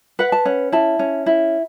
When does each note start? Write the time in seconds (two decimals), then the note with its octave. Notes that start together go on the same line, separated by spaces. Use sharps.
0.19 B4 F#5
0.32 A5
0.45 C#4 F#5
0.72 E4 A5
0.99 C#4
1.26 E4